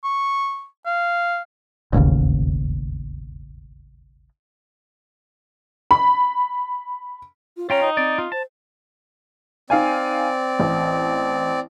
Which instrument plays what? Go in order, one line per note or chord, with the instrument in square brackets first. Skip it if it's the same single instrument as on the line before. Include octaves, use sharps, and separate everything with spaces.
[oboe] C#6
F5
[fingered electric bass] E1 A1 D#2 C#3
[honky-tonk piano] B5
[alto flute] F4
[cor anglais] C#4 [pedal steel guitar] F4 G5 A#5 [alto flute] C#5
[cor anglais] D#4
[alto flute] C4 [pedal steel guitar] D5
[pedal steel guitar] F4
[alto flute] C5 [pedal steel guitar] A5
[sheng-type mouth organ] C4 D5 [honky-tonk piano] D#4 F5 G#5
[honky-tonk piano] A1